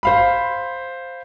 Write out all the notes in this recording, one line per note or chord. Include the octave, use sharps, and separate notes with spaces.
C5 F5 B5